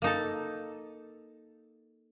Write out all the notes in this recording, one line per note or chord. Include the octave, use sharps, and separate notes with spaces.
A#3 D#4 A4